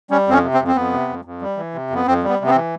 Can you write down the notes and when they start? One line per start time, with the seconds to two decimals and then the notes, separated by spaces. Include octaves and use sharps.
0.10 G3 C#4
0.27 F2 C4
0.32 C#4
0.44 C3
0.54 C4
0.60 F2
0.67 C4
0.76 F2 B3
0.93 C3
1.09 F2
1.25 F2
1.41 G3
1.57 E3
1.74 C3
1.90 F2 B3
2.06 F2 C4
2.23 G3 B3
2.40 C3
2.45 B3
2.50 C4
2.55 E3